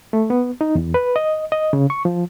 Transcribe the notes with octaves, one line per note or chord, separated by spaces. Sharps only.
A3
B3
D#4
E2
B4
D#5
D#5
C#3
C#6
F3